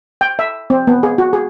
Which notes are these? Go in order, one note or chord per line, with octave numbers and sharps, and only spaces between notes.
G5
E5
C4
B3
G#4
F#4
G#4